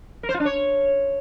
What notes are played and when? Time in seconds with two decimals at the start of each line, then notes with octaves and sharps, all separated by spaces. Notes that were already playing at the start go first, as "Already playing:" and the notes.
0.23 A#4
0.29 C5
0.34 F4
0.40 D4
0.45 C#5